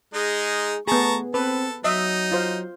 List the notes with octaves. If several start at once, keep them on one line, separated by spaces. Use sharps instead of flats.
G#3 D#4 G#4
A3 B3 G#4 A5 A#5 C#6
C4 A4 B4
F#3 D#4 D#5 E5
F4 C5 F5